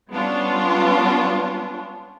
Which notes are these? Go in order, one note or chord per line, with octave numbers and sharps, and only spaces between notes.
G3 B3 C#4 D4 F4